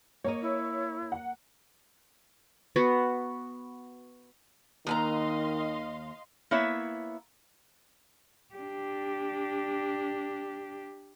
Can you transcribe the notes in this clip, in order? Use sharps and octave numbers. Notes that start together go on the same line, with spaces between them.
A#3 A#4 C#5 D#5
E4
F#5
B3 F#4
D#2 D#3 D#5 F5 G#5 A#5 C6
A#3 B3 E4 C#5 E5
D4 G4